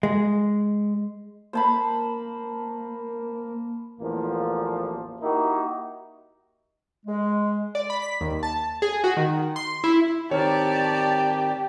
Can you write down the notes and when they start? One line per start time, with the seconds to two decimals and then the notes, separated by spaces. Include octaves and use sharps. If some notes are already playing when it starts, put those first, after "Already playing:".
0.03 G#3
1.53 A#3 C5 A5 B5
4.00 A1 E2 A#2 F3 A#3
5.22 A#3 D#4 E4 F#4 G4 A#4
7.06 G#3
7.75 D5
7.90 B5
8.02 B6
8.21 D#2
8.43 A5
8.82 G#4
9.04 F#4
9.17 D#3
9.56 C6
9.84 E4
10.31 D#3 C4 G4 A#4 C#5 D5 A5